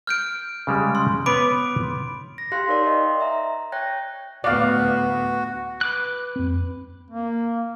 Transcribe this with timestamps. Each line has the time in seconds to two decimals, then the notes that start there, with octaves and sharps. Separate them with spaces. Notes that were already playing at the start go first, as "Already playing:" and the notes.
0.07 F6 G6 D7
0.67 C#3 G3 G#3
0.95 C6
1.26 B3 B4 C#5 B5 D6 D7
2.38 A#6
2.52 G4 F5 C6 F#6
2.68 D#4 A#4 C#5 D5 C6
2.87 D#5 F5 G5
3.20 E5 A#5
3.72 C#5 G5 F#6 G#6 A#6
4.44 D2 A2 B3 F#4 D5 F5
5.81 B4 D6 F#6
6.36 F2 C4
7.11 A#3